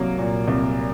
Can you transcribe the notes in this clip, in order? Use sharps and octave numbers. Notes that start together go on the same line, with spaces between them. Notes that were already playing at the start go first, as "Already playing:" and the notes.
Already playing: C2 F#3 A#3
A#2
C2